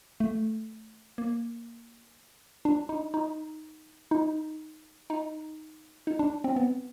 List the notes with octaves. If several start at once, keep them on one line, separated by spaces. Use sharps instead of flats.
A3
A#3
D4
D#4
D#4
D#4
D#4
D#4
D4
C4
B3